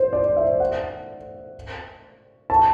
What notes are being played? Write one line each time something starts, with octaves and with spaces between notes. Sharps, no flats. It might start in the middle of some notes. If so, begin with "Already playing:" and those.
Already playing: C5
D5
E5
F#5
A5